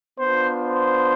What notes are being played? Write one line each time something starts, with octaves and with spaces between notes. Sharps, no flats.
B3 D4 F4 C5
C5